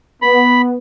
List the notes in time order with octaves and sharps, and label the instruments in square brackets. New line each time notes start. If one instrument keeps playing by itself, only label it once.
[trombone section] B3 [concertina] B5